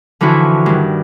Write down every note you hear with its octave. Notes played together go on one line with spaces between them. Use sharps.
D3 E3 F3 E4 F#4
G2 D#3